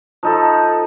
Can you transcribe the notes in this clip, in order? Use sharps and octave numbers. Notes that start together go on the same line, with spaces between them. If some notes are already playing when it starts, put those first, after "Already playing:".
F3 D#4 A4